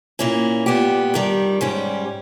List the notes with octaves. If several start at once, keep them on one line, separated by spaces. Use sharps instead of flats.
A#2 A#3 C#4 E4
A#2 G3 B3 G4
G2 D#3 G3
G#2 G3 C#4 G4